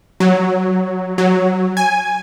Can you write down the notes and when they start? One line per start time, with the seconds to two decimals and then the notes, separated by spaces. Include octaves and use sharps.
0.20 F#3
1.18 F#3
1.77 G#5